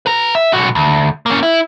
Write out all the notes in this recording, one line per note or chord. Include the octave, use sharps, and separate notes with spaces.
B4 A#5
E5
B1 F#4
D2
A#3 C#4
E4